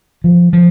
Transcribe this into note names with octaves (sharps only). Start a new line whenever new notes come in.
F3
F3